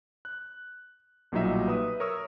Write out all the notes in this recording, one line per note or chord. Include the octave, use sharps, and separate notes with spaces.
F#6
B1 A#2 F#3 G3 D#4 E5
B4 E5 D#6
A#4 C#5 C#6 D#6 E6